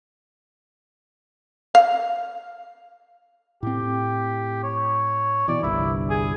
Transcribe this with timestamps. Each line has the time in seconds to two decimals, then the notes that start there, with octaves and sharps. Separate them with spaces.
1.75 F5
3.63 A2 C4 G4
4.63 C#5
5.48 B2 E3 D5
5.63 G1 C2 G2 E4
6.10 G#4